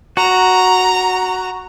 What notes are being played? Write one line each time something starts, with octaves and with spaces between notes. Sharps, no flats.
F#4 A#5